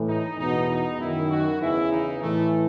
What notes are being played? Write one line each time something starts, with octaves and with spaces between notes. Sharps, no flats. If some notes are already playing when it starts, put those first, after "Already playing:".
Already playing: A2 E3
D#4
E2 B2 D#4
D#4
F#2 D#3 E4
F#4
E2 C#3 E3 E4
D#4
A2 E3 A3